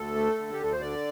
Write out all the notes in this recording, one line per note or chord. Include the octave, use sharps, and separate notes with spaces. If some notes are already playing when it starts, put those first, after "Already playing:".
Already playing: D2 A4
A3
D3
G4
D2 A4
C5
D3 D5